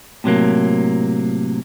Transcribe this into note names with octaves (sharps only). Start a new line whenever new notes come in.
A2 C3 F#3 A#3